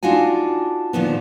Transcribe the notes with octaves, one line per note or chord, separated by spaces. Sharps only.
D4 D#4 F4 F#4 G#5
A#2 D#3 F3 B3